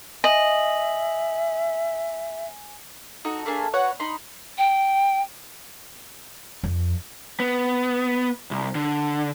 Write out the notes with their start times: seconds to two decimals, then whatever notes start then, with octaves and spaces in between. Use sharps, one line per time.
0.24 D#5 E5 G#5 F#7
3.25 D#4 F#4 A4 D#5
3.46 A3 A#3 D4 G#4
3.74 F#4 B4 C#5 F#5
4.00 D#4 B5 C6
4.58 G5
6.63 F2
7.40 B3
8.51 C2
8.75 D3